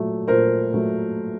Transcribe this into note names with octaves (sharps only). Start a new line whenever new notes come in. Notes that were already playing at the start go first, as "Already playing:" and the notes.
Already playing: A#2 F#3 A3
A#2 A#4 C5
F#3 A3